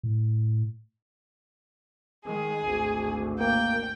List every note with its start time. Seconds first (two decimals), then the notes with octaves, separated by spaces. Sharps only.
0.03 A2
2.26 D#3 G#3 G#4
2.64 G#1 D2
3.40 A#3 G5